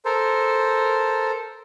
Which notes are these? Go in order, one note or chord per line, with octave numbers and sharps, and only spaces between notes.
A4 A#4 C5